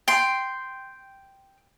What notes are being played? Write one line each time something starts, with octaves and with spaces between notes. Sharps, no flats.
G5 C6